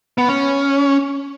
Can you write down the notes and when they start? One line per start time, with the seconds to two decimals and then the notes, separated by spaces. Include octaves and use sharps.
0.18 B3
0.28 C#4